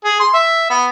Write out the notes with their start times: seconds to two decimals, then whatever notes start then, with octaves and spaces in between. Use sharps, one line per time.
0.05 G#4
0.20 C6
0.34 E5
0.70 B3